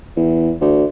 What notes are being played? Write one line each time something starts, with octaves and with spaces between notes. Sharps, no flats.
E2
D2